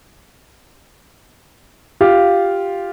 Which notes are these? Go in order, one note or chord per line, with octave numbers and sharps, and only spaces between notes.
F4 G4 F5